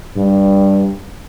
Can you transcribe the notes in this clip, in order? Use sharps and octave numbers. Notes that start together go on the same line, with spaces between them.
G2